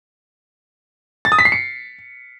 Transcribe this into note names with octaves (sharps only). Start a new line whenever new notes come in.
A6
D#6
B6
C7
C#7